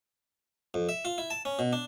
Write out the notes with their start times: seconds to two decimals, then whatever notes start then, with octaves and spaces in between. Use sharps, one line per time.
0.74 F2
0.89 E5
1.05 F4
1.18 E4
1.30 A5
1.45 C#4
1.59 B2
1.73 D4